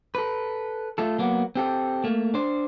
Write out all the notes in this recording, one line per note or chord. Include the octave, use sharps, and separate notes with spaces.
A4 B4
A3 F4 A4
F#3 A#3 B3
C4 G4 A4
A3 A#3
D4 C5